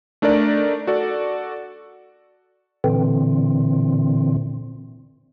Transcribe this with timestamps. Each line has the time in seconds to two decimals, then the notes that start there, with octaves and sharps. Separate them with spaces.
0.22 A3 D4 D#4 A#4 D5
0.87 F#4 A4 D5
2.84 A#2 D3 E3 C4